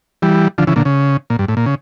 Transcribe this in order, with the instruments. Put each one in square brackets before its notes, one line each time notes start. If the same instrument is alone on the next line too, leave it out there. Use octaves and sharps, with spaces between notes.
[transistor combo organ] E3 G3
D3 F3
C#3 E3
A#2 D3
C#3
A#2
G2
A2
A#2
C#3